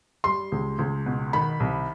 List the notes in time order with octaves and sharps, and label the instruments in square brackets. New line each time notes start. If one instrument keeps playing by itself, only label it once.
[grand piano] G3 [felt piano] C6
[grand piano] C#2
C#2
B2
[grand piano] D#3 [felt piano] B5
[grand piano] C2